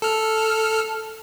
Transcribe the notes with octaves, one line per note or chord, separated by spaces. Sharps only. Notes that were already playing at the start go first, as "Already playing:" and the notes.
A4 F6